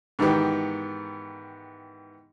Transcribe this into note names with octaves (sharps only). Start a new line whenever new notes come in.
G#2 D#3 E3 B3 G4